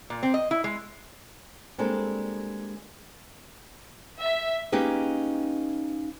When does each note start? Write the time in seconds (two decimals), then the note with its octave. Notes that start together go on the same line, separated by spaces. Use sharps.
0.10 A#2
0.23 C4
0.34 D#5
0.51 E4
0.64 G#3
1.78 G3 G#3 A#3 C4 D4 A4
4.20 E5
4.72 A#3 C#4 D#4 G4 G#4 B4